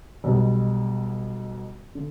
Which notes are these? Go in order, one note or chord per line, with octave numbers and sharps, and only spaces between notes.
B1 B2 G3
D3